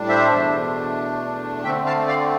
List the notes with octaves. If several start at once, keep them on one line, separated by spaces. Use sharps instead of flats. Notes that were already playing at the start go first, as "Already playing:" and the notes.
Already playing: A2 G3 D4
C5 E5
E2 B2 A3 D4
D3 A3 C4 E5 G5
F5 A5
D5 F5